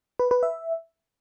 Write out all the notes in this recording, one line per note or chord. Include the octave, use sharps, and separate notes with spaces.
B4
B4
E5